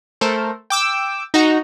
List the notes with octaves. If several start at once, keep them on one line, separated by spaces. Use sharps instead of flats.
A3 A4 A#4 C5
G5 D6 E6
D#4 F#4 A#5